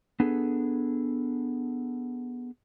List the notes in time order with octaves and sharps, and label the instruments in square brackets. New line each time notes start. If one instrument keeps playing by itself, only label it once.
[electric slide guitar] B3 D4 G#4 A4